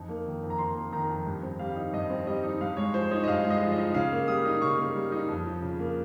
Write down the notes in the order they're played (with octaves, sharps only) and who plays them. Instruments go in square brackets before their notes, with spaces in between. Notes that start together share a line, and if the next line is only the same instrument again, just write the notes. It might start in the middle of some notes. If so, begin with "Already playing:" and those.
Already playing: [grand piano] F2 D#4
A#3
D#3
F2
A#5
F2 C6
A#3
D#3 A#5
F2
G2
C4
G3 F5
D#4
G2 D#5
C4
G3 D#5
D#4
G2 F5
G#3 C#5
F3 C5
D#4 C#5
D#5
G2 F5
G#3
D#5
F3
D#5
D#4
C#3 F5
A#3
G3 D#6
D#4
C#3 C#6
A#3
G3
D#4
F2
F3
C#3
A#3